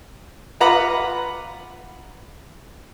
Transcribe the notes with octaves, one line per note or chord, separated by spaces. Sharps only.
F4 B4 F#5 A#5 B5 D6